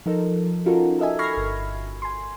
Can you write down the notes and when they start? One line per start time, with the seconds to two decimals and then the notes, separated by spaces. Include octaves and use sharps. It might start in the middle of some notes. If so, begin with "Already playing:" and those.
0.06 F3 D#4 A4 A#4
0.66 C#4 D#4 F4 F#4 A4 A#4
0.99 A4 A#4 D#5 E5 G#5
1.19 B5 C#6 F6 G#6 A#6 C7
1.37 G1
2.02 G#5 C6